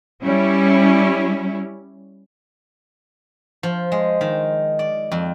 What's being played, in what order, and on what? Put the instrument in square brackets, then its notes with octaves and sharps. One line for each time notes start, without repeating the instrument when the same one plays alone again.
[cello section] G3 C#4 E4
[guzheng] F3
G#3
D#3
D5
F2